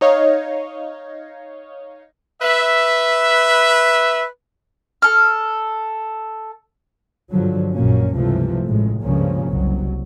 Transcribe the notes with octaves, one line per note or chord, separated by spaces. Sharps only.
D#4 C#5 D#5 F5
B4 E5
A4 F6
G2 D3 F3 F#3
A#1 F#2 A#2 A#3 C#4
C#2 G2 C3 E3 F3 A3
A1 A2 G#3
C#2 G2 C#3 F3 A#3 C#4
F#1 C2 F#3